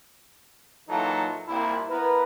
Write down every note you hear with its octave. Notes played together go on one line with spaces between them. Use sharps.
A#2 E3 F#3 D#4 F4 A4
C2 A#2 E4
B3 E4 A#4 B4